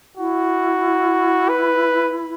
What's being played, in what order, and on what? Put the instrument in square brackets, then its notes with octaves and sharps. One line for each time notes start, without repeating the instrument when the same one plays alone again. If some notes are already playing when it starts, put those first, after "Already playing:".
[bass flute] E4 [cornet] F#4
[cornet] B4